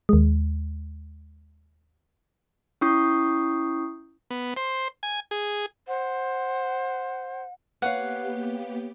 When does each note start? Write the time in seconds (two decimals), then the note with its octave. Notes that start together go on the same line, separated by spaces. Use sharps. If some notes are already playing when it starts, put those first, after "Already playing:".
0.09 D#2 G#3
2.81 C#4 E4 C#6 D#6 G6 C7
4.30 B3
4.57 C5
5.03 G#5
5.31 G#4
5.88 C5 F#5
7.82 A#3 B3 G4 B4 C#5 F5 F#5